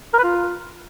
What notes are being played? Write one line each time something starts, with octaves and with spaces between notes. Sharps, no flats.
A#4
B4
F4